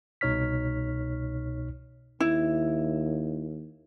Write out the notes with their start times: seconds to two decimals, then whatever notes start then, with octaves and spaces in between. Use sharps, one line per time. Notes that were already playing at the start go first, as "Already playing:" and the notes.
0.21 C2 B2 D#4 C#5 F6 B6
2.20 D#2 E4